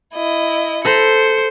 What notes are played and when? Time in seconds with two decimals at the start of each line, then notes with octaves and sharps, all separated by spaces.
0.14 E4 D#5
0.85 A4 C5 A#5 B5 C#7